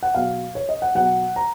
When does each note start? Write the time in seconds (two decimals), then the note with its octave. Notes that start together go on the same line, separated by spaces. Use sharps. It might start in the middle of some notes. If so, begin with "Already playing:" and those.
0.03 F#5
0.14 B2 F#3 F5
0.55 C#5
0.69 D#5
0.82 F#5
0.95 B2 F#3 F#5
1.36 A#5